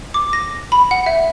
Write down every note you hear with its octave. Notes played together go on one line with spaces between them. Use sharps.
D6
A#6
B5
F#5
E5